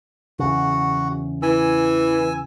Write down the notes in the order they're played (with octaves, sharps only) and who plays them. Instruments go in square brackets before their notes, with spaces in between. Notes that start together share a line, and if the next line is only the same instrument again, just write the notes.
[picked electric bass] E2 C#3 [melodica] F#4
[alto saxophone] E3 [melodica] G#5 E6